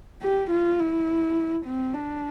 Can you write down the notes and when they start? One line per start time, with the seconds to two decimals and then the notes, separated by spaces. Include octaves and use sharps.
0.22 G4
0.50 F4
0.79 E4
1.65 C4
1.93 D4